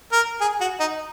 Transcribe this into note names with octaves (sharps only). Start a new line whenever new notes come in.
A#4
G#4
F#4
D#4